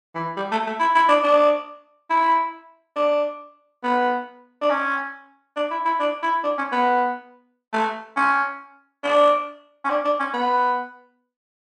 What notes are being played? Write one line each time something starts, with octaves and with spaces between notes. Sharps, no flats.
E3
G3
A3
A3
E4
E4
D4
D4
E4
D4
B3
D4
C#4
D4
E4
E4
D4
E4
D4
C#4
B3
A3
C#4
D4
C#4
D4
D4
C#4
B3